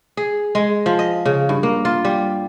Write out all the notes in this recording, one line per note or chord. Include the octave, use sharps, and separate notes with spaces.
G#4
G#3
F3
D#5
C#3
G2
A#3
F4
G3